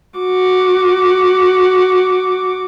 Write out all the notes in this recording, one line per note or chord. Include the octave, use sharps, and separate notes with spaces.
F#4 D6